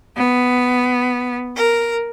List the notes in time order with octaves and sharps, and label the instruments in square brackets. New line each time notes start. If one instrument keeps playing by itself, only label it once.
[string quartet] B3
A#4